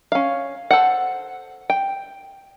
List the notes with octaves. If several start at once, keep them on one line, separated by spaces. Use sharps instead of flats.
C#4 F5
A4 C5 F#5
G5